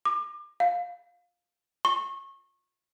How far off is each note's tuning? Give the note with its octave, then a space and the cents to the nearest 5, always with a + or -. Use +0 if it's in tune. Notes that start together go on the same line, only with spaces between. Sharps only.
D6 +30
F5 +15
C#6 -25